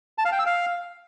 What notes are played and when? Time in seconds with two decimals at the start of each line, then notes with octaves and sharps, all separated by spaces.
0.18 A5
0.25 F5
0.32 G5
0.39 E6
0.46 F5